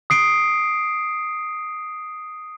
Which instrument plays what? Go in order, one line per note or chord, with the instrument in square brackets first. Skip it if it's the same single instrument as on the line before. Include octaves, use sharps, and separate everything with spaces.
[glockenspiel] D#6 C7 D7